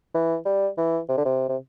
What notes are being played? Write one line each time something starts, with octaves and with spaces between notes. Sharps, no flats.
E3
G3
E3
C3
D3
C3
C3